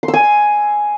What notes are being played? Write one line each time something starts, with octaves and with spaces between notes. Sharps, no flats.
C6
E6
G#5